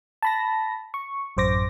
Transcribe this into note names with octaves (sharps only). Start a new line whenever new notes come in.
A5 B5 A#6
C#6
A1 F#2 C5 D6 A#6